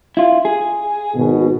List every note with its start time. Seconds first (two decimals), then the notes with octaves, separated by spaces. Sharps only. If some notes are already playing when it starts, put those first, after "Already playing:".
0.17 E4 F4
0.45 G#4
1.15 G#1 B2